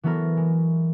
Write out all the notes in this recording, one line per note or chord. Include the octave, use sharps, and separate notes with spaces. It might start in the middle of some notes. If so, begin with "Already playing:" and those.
E3 F#3 B3 E4 A4 A#4
G#3